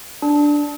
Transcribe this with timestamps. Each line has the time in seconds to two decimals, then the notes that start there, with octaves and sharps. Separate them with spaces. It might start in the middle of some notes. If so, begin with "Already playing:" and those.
0.22 D4